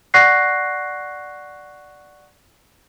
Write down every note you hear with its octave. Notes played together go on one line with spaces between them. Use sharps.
D5 F#5 C#6 F#6 A#6 C7